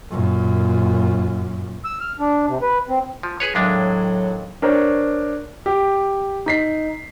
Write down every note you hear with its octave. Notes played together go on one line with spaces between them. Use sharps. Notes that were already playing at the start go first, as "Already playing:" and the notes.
F#2 A#2
E6
F6
D4
C3
B4
C4
F3
G#4 B4 C#5
D#2 A2 F#3 G#3 D4
D4 A#4 C5 C#5
G4
D#4 B6 C7